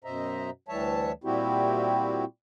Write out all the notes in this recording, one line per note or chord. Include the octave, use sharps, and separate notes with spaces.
F#2 B2 C5 D#5 E5 A#5
D2 E3 G3 C#5 E5 A5
A#2 G3 C4 E4 F#4 G4